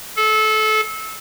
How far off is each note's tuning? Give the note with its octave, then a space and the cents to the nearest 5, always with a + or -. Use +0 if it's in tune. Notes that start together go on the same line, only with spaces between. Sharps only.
A4 -25